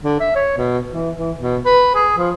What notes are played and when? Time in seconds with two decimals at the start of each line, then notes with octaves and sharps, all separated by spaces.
0.04 D3
0.20 E5
0.35 C#5
0.57 B2
0.91 E3
1.18 E3
1.39 B2
1.65 B4
1.95 G#4
2.18 F3